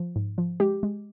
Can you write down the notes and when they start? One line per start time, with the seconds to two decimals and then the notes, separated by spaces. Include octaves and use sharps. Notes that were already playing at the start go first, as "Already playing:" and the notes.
Already playing: F3
0.16 G#2
0.38 F3
0.60 G#3 G4
0.83 G#3